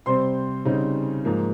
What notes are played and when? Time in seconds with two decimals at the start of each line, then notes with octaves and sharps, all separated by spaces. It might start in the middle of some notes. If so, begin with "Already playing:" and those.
0.06 C3 G3 C4 C5 C6
0.65 C#3 G3 C4 D#4
1.25 G#2 F3 A#3